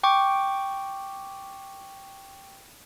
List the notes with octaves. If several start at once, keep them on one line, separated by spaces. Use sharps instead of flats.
G5 C#6 D6